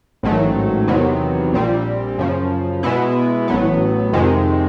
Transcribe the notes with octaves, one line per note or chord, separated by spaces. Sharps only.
A1 G#2 D#3 F#3 A3
E2 C3 D#3 F#3 B3
A#1 A#2 G3 C4
F#2 C#3 F3
B2 G#3 B3 E4
A1 A2 F#3 B3
F2 C3 D#3 G#3